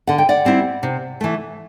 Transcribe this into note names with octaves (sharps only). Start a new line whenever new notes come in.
D3 F#5
G5
D5 F#5
G3 C4 E4
C3
E3 A3